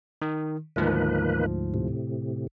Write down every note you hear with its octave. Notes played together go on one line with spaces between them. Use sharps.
D#3
D2 G#2 D#3 F3 A#3 B4
A2 C3